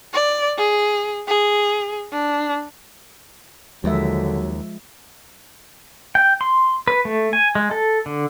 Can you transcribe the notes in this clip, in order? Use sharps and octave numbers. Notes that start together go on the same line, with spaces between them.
D5
G#4
G#4
D4
D#2 D3 F3 F#3 G#3 E5
G5
C6
B4
A3
G#5
G#3
A4
D3